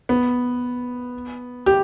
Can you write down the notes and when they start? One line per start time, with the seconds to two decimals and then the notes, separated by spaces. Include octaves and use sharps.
0.09 B3
1.66 G4